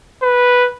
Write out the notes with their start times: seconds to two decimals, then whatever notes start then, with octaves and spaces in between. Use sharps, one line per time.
0.23 B4